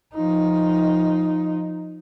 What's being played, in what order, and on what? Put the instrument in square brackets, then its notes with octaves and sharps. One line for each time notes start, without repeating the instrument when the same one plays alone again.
[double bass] F3 D#4